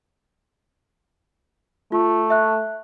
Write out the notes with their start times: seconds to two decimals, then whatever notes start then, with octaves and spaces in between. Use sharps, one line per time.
1.92 A3 F4
2.30 E5 F#6